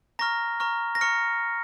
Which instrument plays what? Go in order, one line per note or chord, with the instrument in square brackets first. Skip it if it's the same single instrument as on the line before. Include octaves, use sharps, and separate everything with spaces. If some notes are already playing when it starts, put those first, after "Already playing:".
[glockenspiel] A#5 C#6 F6 A#6
A#5 C#6 F6
A#6
A#5 C#6 F6 C#7